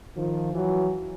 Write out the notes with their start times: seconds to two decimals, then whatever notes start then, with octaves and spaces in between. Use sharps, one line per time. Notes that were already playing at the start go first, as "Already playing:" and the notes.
0.15 D#3 F3
0.53 E3 F#3